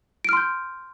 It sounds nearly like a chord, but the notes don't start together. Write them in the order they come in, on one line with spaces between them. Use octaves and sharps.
D7 F6 C6 G6